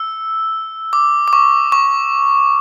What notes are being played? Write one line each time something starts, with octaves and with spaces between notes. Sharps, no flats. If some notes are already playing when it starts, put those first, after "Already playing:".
Already playing: E6
D6
D6
C#6
C#6